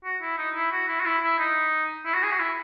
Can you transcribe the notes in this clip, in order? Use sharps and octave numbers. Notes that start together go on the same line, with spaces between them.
F#4
E4
D#4
E4
F#4
E4
F#4
E4
E4
D#4
E4
F#4
G#4
F#4
E4